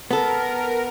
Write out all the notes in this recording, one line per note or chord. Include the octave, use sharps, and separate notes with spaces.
B3 A4 A#4